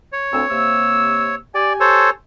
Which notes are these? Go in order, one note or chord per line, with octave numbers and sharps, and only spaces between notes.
C#5
D2 C4 E6
C3 A#3 E6
G4 D5 G#5
A4 C5 C#5